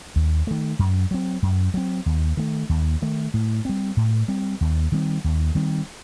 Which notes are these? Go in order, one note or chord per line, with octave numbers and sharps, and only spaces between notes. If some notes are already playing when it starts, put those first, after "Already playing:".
D#2
D#3 A3
F#2
F#3 C4
F#2
F#3 C4
D#2
D#3 A3
D#2
D#3 A3
A2
G3 C4
A2
G3 C4
D#2
D#3 G3 C4
D#2
D#3 G3 C4